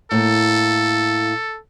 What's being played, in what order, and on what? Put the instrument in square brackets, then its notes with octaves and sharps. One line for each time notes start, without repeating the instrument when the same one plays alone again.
[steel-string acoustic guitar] A2 A#3 [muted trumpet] A4